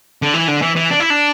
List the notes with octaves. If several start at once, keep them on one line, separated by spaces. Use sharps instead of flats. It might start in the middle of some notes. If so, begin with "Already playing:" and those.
D3
E3
D3
E3
E3
D4
E4
D4